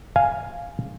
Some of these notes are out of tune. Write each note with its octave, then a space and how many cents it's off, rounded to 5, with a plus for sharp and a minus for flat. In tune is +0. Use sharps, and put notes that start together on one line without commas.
F5 +0 G#5 +0